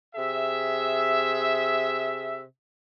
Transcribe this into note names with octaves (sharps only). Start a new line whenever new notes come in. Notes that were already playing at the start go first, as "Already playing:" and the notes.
C3 G#4 E5